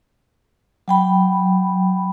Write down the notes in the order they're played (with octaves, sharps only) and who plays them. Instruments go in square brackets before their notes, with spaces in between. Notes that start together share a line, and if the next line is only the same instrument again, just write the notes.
[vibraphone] F#3 G5 B5